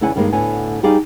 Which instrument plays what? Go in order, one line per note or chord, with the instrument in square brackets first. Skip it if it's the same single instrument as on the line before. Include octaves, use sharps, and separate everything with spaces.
[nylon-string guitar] E2 C#3 E4 D5 F#5 G#5
G2 D#3 G3 G#3 A#3
D2 A2 D3 B3 G#5
G3 D#4 G4 G#4 D5 F5